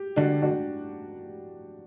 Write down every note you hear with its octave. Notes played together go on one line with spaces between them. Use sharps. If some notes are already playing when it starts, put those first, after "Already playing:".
Already playing: G4
D3 D4 F#4
D4 F#4